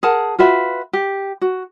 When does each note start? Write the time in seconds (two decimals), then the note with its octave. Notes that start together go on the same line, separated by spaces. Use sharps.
0.03 G#4 A#4 F#5 A5
0.39 F4 F#4 B4 E5
0.93 G4
1.41 F#4